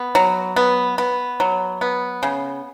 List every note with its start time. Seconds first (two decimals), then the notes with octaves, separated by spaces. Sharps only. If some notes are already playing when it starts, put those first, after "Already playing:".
Already playing: B3
0.15 F#3
0.56 B3
0.98 B3
1.40 F#3
1.81 B3
2.23 C#3